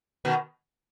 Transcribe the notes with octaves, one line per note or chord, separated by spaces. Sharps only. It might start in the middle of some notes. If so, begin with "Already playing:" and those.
B2 D#3